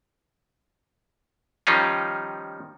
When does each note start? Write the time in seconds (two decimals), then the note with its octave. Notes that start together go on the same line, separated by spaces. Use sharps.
1.67 D#3 F3 G3 C#4 D#4 F4